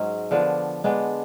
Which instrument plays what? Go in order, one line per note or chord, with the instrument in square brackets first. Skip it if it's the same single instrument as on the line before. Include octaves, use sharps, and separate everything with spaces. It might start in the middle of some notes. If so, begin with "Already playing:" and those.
Already playing: [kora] G#2 F#3 C#4
D3 F3 B3 D4
D3 G#3 B3 D4